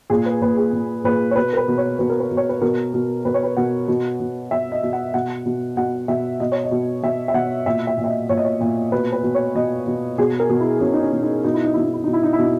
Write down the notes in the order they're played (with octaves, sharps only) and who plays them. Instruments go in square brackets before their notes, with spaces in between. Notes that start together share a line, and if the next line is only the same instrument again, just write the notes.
[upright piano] A#2 G#4
B4
A#2 B4
G#4
A#2
A#2 B4
C#5
B2 B4
A#4
B4
B2
C#5
B2 B4
A#4
B4
B2
C#5
B4
B2 A#4
B2
B2 B4
C#5
B4
B2 F#5
B2
B2
B2 E5
D#5
B2
F#5
B2 F#5
B2
B2 F#5
B2 E5
B2 D#5
C#5
D#5
B2
B2 E5
E5
B2 F#5
A#2 E5
E5
A#2
E5
D#5
A#2 C#5
D#5
C#5
A#2
B2 B4
B4
B2
C#5
B2 D#5
B2
B2 G#4
A#4
B2
E4
B2 C#4
D#4
C#4
B2
D#4
B2 D#4
E4
D#4
B2 E4
D#4
E4
B2 D#4
E4
D#4
E4
B2 D#4